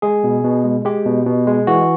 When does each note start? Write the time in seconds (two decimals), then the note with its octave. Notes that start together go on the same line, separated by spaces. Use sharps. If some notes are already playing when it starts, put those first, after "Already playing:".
0.02 G#3 G#4
0.24 B2
0.44 B2
0.64 G#3
0.85 G#3 G4
1.05 B2
1.26 B2
1.47 G#3
1.67 E3 F#4